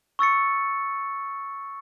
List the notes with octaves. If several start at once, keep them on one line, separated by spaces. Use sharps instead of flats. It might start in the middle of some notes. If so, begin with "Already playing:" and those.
C#6 E6 A6 C#7